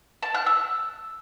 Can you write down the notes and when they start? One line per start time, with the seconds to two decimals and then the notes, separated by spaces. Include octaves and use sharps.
0.23 A5
0.34 F#6
0.46 E6